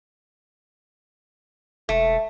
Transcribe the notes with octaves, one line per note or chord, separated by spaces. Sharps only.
E1 A3